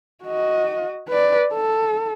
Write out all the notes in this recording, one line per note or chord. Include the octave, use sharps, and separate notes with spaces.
F#4 D#5
B4 D5
A4